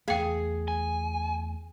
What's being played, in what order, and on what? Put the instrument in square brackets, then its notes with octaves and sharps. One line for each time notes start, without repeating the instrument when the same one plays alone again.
[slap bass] E2 A3 [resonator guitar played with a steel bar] G#4 [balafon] F5 G5
[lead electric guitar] G#5